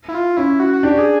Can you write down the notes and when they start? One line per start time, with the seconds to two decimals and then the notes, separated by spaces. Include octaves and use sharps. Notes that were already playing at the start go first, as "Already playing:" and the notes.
0.08 E4
0.14 F4
0.37 C#4 E4
0.60 F#4
0.73 F#4
0.83 D4 G4
0.98 G#4